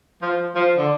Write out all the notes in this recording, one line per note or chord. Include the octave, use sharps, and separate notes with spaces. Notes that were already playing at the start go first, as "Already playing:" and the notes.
F3
F3
D3